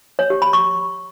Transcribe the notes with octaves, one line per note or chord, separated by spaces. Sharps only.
C#5
G4
B5
C#6